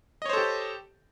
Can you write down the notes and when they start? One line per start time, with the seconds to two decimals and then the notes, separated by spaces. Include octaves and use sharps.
0.22 D#5
0.26 C#5
0.29 C5
0.33 A4
0.37 G4